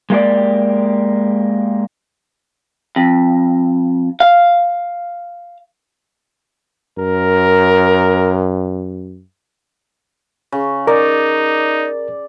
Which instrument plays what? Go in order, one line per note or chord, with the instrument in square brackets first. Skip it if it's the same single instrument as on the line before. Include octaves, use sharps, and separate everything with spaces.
[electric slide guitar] G#3 A#3 G4 D5
[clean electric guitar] F2
F5
[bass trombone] F#2 [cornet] A#4
[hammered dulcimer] C#3
[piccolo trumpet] D#4 [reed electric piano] A#4 [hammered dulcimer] D5